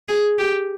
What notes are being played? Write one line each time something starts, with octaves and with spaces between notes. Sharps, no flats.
G#4
G4